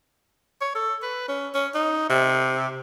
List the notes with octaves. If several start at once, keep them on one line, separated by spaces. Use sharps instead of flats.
C#5
A4
B4
C#4
C#4
D#4
C3